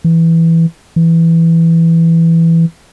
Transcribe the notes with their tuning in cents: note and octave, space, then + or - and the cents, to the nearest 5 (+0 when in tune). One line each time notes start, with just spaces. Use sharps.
E3 +0
E3 +5